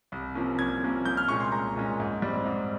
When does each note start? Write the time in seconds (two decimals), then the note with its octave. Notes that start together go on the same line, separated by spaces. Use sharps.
0.12 C2
0.35 C3 F3 A#3 C#4
0.58 C2 G#6
0.82 C3 F3 A#3 C#4
1.05 C2 G6
1.17 F6
1.28 A#2 G#3 C#4 C#6
1.40 C6
1.52 C2 A#5
1.76 A#2 G#3 C#4
2.00 G#2
2.22 G3 C4
2.46 G#2